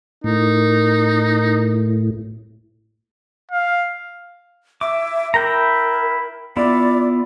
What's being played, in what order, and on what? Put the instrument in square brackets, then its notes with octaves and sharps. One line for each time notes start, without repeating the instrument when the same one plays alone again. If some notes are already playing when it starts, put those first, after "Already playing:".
[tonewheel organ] A2 [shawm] D#4 [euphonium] A#4
[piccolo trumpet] F5
[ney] E5 [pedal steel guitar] D6
[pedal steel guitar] E4 G5 A#5 [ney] A#4
[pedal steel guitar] B3 E4 F4 [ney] D5